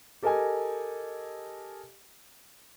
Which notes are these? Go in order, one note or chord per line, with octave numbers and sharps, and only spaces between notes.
G4 A4 A#4 D#5 G#5